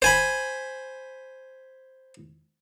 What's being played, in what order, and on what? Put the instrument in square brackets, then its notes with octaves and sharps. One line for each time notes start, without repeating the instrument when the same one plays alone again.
[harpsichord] C5 G#5 B5